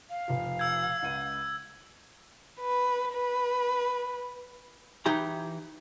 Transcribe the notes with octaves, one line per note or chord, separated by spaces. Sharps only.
F5
F1 F3
E6 G6 G#6
C#2 F#5 D#7
B4
B4
E3 D#4 G4 A#5 B5